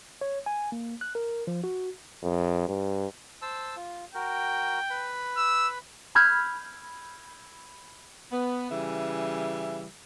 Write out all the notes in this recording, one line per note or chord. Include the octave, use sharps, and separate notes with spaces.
C#5
G#5
A#3
F#6
A#4
F3
F#4
F2
G2
C5 A5 E6
F4
F#4 A#4 G5
B4 B5
E6
B5 E6 F6 G6 G#6
B3
C#3 E3 G3 E5